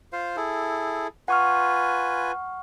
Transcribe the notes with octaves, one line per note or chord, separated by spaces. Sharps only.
F4 C5 F5
E4 G#4 A4
F4 B4 F#5 G#5 C#6 F6